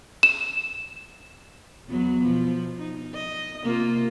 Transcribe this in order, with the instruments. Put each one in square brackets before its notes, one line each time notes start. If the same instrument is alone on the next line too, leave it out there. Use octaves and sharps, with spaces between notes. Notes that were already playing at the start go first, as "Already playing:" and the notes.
[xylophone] E7
[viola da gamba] E2 F#3 B3
B2 F3
D#4
D#5
C3 A#3 F4